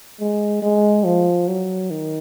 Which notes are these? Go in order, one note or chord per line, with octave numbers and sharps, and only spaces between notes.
G#3
G#3
F3
F#3
D#3